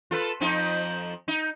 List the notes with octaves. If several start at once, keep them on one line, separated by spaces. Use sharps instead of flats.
F4 A4 B4
F2 F3 D#4
D#4